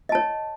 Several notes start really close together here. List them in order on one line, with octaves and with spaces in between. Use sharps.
D#5 A5 C#5